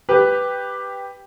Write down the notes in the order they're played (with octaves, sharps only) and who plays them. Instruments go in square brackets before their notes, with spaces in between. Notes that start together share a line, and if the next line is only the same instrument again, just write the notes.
[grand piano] G4 B4